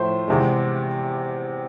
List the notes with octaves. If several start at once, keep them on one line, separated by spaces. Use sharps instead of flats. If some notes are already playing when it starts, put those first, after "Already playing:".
Already playing: A2 F3 A3 C5
E2 C3 G#3